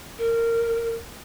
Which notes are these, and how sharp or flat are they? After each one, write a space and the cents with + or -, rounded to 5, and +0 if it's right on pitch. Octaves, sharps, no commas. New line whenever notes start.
A#4 -15